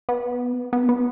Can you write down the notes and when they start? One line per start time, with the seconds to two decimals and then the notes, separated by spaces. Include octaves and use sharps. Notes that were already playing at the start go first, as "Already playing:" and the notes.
0.09 B3
0.73 B3
0.89 B3